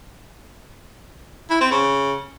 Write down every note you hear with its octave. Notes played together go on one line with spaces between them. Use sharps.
E4
C4
C#3